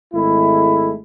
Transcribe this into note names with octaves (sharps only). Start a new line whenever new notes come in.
G#1 G#3 A3 E4